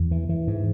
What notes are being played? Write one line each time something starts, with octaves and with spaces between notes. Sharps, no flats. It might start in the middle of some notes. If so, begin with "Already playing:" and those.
Already playing: E2
E3
E3
G#2